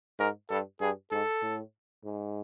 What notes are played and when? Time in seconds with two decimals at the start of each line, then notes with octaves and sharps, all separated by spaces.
0.19 G#2 A#4
0.49 G2 A4
0.81 G2 G#4
1.11 G#2 A4
1.42 A2
2.04 G#2